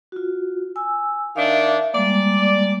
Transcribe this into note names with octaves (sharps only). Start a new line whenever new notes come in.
F4 F#4
G#5 E6
D#3 D4 E5 F5
G3 G#3 A#3 D5